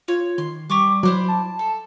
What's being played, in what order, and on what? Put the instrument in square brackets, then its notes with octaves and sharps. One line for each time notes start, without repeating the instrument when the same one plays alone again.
[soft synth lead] F4 [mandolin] C#5
[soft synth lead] D#3 [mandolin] C6
[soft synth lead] G3 [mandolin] G4 C#6 D6
[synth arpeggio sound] F#3 [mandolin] E4 C5 D5
[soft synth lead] A5
[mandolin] A4